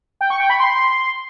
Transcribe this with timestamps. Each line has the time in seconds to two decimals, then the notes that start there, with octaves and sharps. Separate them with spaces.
0.21 G5
0.30 C#6
0.40 G5
0.50 B5
0.59 C6